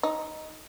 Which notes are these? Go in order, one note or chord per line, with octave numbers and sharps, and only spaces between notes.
D#4